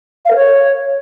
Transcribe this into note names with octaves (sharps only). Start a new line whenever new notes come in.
F5
A#4
C#5